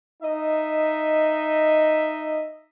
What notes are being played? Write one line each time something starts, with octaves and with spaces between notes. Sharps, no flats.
D#4 D#5 E5